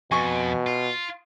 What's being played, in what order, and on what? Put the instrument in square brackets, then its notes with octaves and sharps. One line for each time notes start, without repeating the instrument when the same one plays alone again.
[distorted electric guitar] F2 [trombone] B2 [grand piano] G#5 C#6
[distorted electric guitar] F4